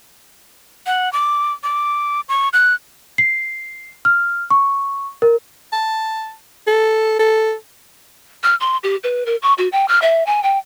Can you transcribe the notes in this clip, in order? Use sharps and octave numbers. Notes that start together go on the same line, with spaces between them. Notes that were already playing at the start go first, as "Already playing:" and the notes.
F#5
D6
D6
C#6
F#6
C7
F6
C#6
A#4
A5
A4
A4
F6
C6
G4
B4
A#4
C#6
F#4
G5
F6
E5
G#5
G5